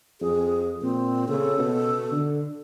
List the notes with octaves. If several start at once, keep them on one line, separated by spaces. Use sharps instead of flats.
F2 G#4
A#2 C4
C#3 A4
B2
D3